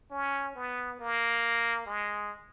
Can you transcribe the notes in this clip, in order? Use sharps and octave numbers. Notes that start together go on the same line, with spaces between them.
C#4
B3
A#3
G#3